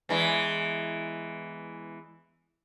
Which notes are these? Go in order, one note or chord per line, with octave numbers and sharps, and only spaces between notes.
E2 E3 G#3